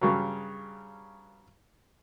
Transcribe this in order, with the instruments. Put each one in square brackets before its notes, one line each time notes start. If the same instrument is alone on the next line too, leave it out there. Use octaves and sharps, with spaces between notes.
[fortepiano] G2 C#3 F#3